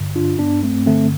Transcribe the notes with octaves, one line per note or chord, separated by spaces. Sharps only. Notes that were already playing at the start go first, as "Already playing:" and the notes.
Already playing: G2 D3
D4 F4
G2 B3 D4
A3 C4
D3 A3 C4